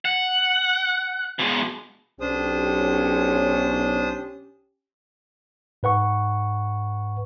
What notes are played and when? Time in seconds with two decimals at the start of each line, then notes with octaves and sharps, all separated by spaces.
0.05 F#5
1.39 B2 G#3
2.21 B1 C#4 D4 G4 C5 D#6
5.83 G#2 B4 F#5 C#6